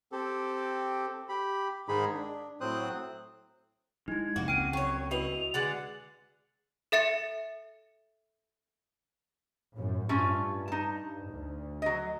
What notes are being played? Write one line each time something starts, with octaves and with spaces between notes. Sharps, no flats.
C4 G4 A4
G4 B5
G#2 D#3 G#3 D#4 G#4 B5
D4
A2 F#3 C4 C5 D#6 F#6
G#3 D#4 E4 G#6
F2 C3 A#3 F#4
C#2 C#3 C4 G5 F6 D7 D#7
F#3 C#5 G5 C#6
E4 F#4 B4 D#5 F7
D3 G#3 F#5 A6
A4 E5 A6 C#7
F#2 A2
G2 A3 C#4 F4
D#4 A5
D2
F#3 D#5